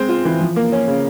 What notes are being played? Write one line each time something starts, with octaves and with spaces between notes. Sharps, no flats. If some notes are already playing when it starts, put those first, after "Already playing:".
Already playing: G#3 C4
F4
E3
F3
A#3
C#4
C#3